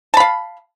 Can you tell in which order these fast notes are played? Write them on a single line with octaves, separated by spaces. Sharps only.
A5 B5 F5